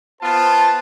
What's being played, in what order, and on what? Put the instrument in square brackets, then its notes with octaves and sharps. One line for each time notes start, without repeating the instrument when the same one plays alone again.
[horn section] B3 F4 [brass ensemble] C5 A5